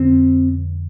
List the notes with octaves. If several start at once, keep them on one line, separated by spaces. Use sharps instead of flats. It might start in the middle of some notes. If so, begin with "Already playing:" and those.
Already playing: F2 D3 C4